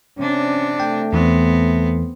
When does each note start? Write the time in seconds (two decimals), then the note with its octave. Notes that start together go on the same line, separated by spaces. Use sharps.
0.18 C3 C#4 D4
0.80 A3 G5
1.13 E2 E3 B3 C4